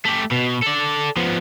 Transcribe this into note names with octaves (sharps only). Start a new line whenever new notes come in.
A3 G4
B2
A4 D5
F3 B3